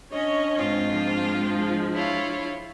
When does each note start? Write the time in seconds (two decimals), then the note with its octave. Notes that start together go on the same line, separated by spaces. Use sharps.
0.10 C#4 D4 C#5 D#5
0.58 G#2 C4 F4
0.88 F3 G#3
1.94 E4 F4 C#5